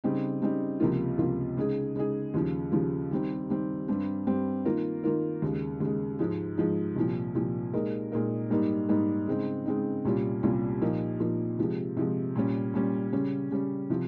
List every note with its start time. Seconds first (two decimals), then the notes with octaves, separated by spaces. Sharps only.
0.04 C#3 G3 C4 D#4
0.42 C#3 G3 C4 D#4
0.80 C#2 C3 F3 A#3 F4
1.18 C#2 C3 F3 A#3 F4
1.57 C#3 G#3 D#4 G#4
1.96 C#3 G#3 D#4 G#4
2.34 D#2 C#3 F3
2.72 D#2 C#3 F3
3.11 D#3 G3 C4
3.50 D#3 G3 C4
3.88 G2 G3 C4
4.27 G2 G3 C4
4.65 D#3 A#3 F4 A#4
5.03 D#3 A#3 F4 A#4
5.42 D#2 C#3 G#3
5.80 D#2 C#3 G#3
6.19 G#2 F3 G#3
6.58 G#2 F3 G#3
6.96 C2 A#2 F3
7.35 C2 A#2 F3
7.74 A#2 G#3 D#4 A#4
8.12 A#2 G#3 D#4 A#4
8.50 G#2 G3 A#3 D#4
8.88 G#2 G3 A#3 D#4
9.27 C#3 G#3 C4 D#4
9.66 C#3 G#3 C4 D#4
10.05 C2 A#2 G3 C#4 F4
10.43 C2 A#2 G3 C#4 F4
10.81 A#2 F3 A#3 D#4
11.20 A#2 F3 A#3 D#4
11.59 C3 F3 G#3
11.97 C3 F3 G#3
12.35 A#2 G3 C#4
12.74 A#2 G3 C#4
13.12 C#3 G3 C#4
13.51 C#3 G3 C#4
13.90 C3 F3